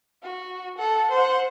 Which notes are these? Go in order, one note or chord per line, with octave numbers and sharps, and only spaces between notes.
F#4
A4 F#5
C5 F#5